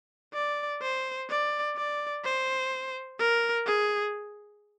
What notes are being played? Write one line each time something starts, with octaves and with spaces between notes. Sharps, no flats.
D5
C5
D5
D5
C5
A#4
G#4